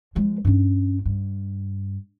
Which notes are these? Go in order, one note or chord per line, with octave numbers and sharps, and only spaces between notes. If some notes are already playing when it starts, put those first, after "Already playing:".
F3 G#3
G2 C#4
G2